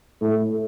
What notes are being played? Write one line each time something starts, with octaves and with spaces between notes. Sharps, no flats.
A2 A3